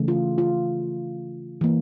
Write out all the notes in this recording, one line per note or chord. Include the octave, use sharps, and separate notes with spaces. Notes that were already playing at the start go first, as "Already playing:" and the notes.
Already playing: C#3 E3 A3
F4
F4
E3 A#3